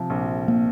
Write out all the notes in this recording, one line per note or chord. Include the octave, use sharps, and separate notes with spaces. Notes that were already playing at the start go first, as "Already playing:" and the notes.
Already playing: C3 F3
A#1
A#3